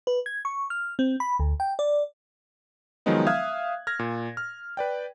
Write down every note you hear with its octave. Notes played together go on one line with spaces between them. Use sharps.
B4
G#6
C#6
F6
C4
B5
D2
G5
D5
D#3 F3 F#3 G#3 B3 D#4
E5 F5 D#6 F6 F#6 G#6
F6 G#6 A#6
A#2
F6
B4 D5 G5